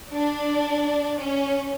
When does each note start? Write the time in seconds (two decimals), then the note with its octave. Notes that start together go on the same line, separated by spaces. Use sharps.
0.12 D4
1.19 C#4